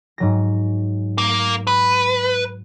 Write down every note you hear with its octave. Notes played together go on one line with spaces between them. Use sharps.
G#2 F#3 A#6
A#3
B4